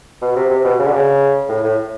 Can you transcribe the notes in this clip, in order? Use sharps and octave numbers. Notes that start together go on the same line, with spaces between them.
B2
C3
C3
B2
C#3
D3
C#3
A2
A2